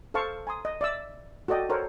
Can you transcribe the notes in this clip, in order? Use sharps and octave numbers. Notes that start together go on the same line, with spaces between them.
A4 C5 F5 A5 C#6
G#5 A#5 C6 D#6
D#5
D5 E5 E6
F#4 A4 D5 D#5 G5
A4 A#4 C5 C#5 F#5